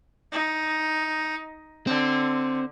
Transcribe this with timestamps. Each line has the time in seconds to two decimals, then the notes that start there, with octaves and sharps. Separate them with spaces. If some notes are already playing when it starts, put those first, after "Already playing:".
0.32 D#4
1.87 D3 C4